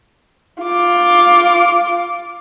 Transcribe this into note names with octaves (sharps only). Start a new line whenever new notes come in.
F4 D6